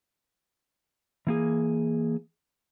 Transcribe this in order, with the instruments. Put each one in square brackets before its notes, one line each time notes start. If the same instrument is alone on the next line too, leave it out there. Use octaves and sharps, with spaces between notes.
[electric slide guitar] E3 A#3 G#4